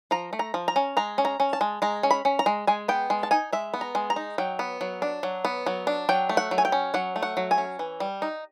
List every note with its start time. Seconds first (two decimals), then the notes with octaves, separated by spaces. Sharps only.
0.11 F3 A#5
0.33 A3
0.39 A#5
0.54 F3
0.68 A#5
0.76 C#4
0.97 G#3 A#5
1.18 C#4
1.25 A#5
1.40 C#4
1.53 A5
1.61 G#3
1.82 G#3 A#5
2.03 C#4
2.11 B5
2.25 C#4
2.39 A#5
2.46 G#3
2.67 G#3 G#5
2.88 B3 G5
3.10 G#3
3.23 A5
3.31 D#4 G#5
3.53 G#3 E5
3.74 B3
3.81 A#5
3.95 G#3
4.10 A#5
4.16 D#4
4.38 F#3 G5
4.59 B3
4.81 F#3
5.02 D4
5.23 F#3
5.45 B3
5.66 F#3
5.87 D4
6.09 F#3 G5
6.29 A3
6.37 F#5
6.51 F#3
6.58 G#5
6.65 G5
6.72 C#4
6.94 F#3 F#5
7.16 A3
7.22 F#5
7.37 F#3
7.51 G#5
7.58 C#4
7.79 E3
8.00 G3
8.22 D#4